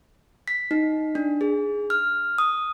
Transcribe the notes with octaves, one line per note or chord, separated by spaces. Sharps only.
B6
D#4
D4
G#4
F6
D#6